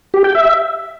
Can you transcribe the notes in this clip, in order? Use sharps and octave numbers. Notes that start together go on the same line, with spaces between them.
G4
G5
E5